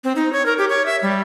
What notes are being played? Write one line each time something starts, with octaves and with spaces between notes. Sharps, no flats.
C4
D#4
C#5
A#4
G4
C#5
E5
G3